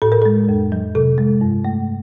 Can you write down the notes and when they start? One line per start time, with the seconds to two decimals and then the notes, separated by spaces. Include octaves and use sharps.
0.02 A2 A4
0.12 A#4
0.22 G#3 A4
0.49 F2
0.72 F#3
0.95 C3 A4
1.18 G#3
1.41 G2
1.65 A3